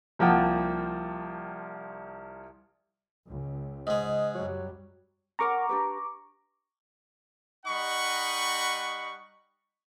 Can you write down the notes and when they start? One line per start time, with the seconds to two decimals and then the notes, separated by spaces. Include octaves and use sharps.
0.19 C2 F3 A#3 F#5 G5 A5
3.26 C#2
3.87 G#2 G#3 D#5
4.34 F#2 F#3 G3
5.39 C#4 A#4 F#5 A#5 C#6 D6
5.69 D4 G4 B4
7.66 G3 D#4 D#5 F#5 B5 C#6